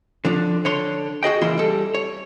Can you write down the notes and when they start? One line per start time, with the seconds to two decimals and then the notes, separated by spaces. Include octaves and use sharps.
0.25 D3 F3 D4
0.65 D3 C#5 C6
1.23 F#4 G#4 D#5 G5
1.41 C#2 A#2 E3 E4 F5 C6
1.58 G3 A4
1.95 C#5